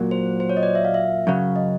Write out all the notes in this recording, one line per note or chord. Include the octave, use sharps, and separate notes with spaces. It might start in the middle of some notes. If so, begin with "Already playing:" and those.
Already playing: A#2 F#3 A#3
C5
C5
C#5
D#5
D5
E5
F5
E5
F#2 C#3 F#3 F5
D#5